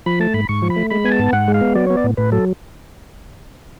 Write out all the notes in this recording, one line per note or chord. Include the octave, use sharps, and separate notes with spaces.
F3 B5
A3 A5
G#2 B5
G#2 C#6
F3
B5
A3
G#3 B5
B3 G#5
A5
G#2
G#2 F#5
G#3
F5
B3
F#3 D5
B3 C#5
D5
A2
A2 B4
F#3 A4